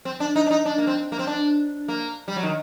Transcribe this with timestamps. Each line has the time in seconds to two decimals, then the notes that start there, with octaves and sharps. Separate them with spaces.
0.05 C4
0.20 D4
0.36 D#4
0.46 D4
0.51 D#4
0.66 D4
0.78 A#3
0.87 C4
1.12 A#3
1.19 C4
1.27 D4
1.88 A#3
2.28 G3
2.36 F#3
2.43 D#3